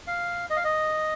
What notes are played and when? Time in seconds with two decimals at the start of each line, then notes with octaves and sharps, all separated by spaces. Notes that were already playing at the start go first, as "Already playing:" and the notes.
0.07 F5
0.50 D#5
0.56 F5
0.64 D#5